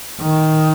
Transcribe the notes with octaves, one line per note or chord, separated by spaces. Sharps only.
D#3